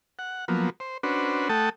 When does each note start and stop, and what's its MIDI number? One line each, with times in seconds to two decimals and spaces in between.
0.19 0.45 78
0.48 0.70 53
0.48 0.70 54
0.48 0.70 58
0.48 0.70 59
0.80 0.98 72
1.03 1.49 61
1.03 1.49 62
1.03 1.49 66
1.03 1.49 71
1.03 1.49 72
1.49 1.69 57
1.49 1.69 69
1.49 1.69 78
1.49 1.69 79
1.49 1.69 81
1.49 1.69 87